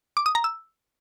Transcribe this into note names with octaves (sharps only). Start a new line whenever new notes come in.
D6
D#6
A#5
E6